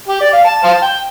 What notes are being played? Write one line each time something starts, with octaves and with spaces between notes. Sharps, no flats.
G4
D5
F5
A5
C5 F5 A5
G5